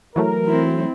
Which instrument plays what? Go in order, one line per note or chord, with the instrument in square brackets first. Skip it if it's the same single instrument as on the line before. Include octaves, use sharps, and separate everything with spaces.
[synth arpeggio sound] E3 F#3 A3 [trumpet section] A#4
[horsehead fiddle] C4 E4